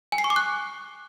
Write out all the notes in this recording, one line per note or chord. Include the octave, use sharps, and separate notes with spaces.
G#5
C7
C#6
D6
F#6